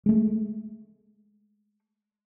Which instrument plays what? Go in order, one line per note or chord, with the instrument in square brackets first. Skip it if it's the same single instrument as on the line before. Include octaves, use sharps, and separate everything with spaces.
[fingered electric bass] G#3 A3